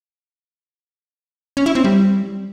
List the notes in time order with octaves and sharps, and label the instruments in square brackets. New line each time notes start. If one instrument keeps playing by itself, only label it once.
[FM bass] C#4
E4
C4
G3